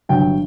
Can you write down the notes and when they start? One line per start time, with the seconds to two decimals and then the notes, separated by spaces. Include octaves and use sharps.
0.09 G1 G2 F#3 G5